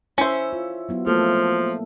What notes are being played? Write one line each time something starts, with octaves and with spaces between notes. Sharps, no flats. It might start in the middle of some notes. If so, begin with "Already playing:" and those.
C#4 E4 C5 E5
F4
F#3 B3 E4
F3 A3 A#3 A4